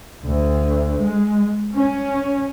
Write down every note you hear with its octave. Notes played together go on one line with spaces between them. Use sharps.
D2
G#3
C#4